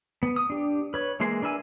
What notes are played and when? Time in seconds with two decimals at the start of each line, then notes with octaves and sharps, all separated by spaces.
0.23 B3
0.36 D#6
0.50 D4 G4
0.94 B4 C#5
1.20 E3 G#3 A#3 C6
1.42 D4 A#4 B4 E5 G#5